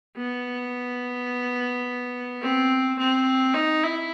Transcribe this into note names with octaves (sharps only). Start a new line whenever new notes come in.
B3
C4
C4
D#4
E4